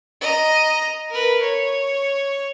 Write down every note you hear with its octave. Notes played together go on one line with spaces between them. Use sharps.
D#5 A#5
A#4 B4
C#5